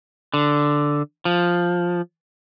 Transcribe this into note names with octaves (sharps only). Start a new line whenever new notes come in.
D3
F3